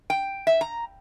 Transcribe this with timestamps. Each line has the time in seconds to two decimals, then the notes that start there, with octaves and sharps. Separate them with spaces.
0.10 G5
0.47 E5
0.61 A#5